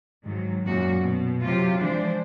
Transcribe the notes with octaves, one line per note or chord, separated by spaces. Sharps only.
G#2 D#3 F#3
F#2 A#2 F#4
B2
C3 F#3 F4 G4
E3 F3 G#3 D4 C5 D5